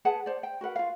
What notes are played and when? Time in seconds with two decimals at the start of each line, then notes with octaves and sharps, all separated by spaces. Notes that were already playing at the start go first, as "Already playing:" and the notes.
0.05 G#4 B4 F#5 A5
0.26 C5 D5
0.43 G5
0.61 F#4 A#4 B4 F#5
0.76 F4 F5